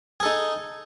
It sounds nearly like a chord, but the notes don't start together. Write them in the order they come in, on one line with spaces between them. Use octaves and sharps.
G#4 A4 D#4